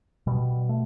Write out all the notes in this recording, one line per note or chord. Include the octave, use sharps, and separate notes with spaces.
B2 G3
A3